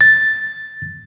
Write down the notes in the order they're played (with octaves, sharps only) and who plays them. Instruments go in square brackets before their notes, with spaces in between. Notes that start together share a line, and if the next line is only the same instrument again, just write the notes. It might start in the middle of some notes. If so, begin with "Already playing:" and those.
[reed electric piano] A6